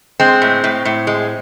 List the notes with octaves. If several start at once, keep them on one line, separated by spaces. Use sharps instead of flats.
G#3 C4
A2
A2
A2
G#3